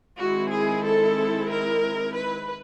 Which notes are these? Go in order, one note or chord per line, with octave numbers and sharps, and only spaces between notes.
D#3 G#3 C4 E4 F#4
G#4
A4
A#4
B4